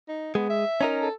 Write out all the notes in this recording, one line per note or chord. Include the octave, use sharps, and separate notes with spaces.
D#4
G#3 B3
E5
C#4 D#4 A#4
A4